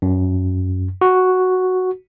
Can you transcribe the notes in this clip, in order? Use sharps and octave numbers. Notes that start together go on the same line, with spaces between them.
F#2
F#4